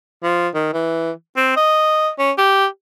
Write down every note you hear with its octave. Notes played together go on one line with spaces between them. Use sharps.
F3
D#3
E3
C4
D#5
C#4
G4